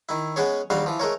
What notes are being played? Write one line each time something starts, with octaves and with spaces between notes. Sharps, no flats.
D#3 E4
G#3 B3 C#4 G#4 C#5
A#1 D#2 G3 F#4 F5
E3 F3
G#3 A3 A#4 C#5